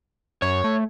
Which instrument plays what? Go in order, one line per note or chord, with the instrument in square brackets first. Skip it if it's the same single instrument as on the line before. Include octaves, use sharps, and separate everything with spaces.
[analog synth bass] F#2 [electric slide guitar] C#5
[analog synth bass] A3